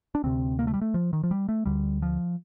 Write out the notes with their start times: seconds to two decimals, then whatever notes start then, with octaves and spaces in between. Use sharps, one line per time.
0.15 D4
0.24 D2 C3 C4
0.59 A#3
0.67 A3
0.74 G3
0.81 A3
0.94 F3
1.13 D#3
1.23 F3
1.31 G3
1.49 A3
1.66 D2 D3 G3
2.02 F3